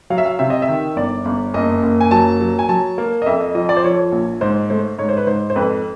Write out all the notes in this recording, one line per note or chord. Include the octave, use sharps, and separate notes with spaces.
F#3 F5
E5
F5
C3 E5
D#5
E5
D#3
G1 D5
G1
F#1 D#5
F#1
G#5
F#3 A5
F#3
G#5
F#3 A5
A#3
D#5
F2 E5
D#5
F3 D#5
D5
C5
F3 C#5
A#1
G#2 C5
A3 C5
G#2 C#5
C5
B4
G#2 C5
C5
F2 B4